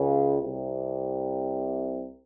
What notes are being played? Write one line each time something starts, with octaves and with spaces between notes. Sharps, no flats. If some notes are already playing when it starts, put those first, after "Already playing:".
Already playing: C#2 C#3
C2 C3